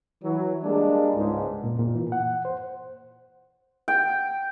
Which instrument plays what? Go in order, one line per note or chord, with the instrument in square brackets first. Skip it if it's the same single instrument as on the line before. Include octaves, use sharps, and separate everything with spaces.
[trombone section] E3 F#3
G3 G#3 A#3 D4
C#2 G#2
[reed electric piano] A#2
A#2
E3
F#5
C5
[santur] G5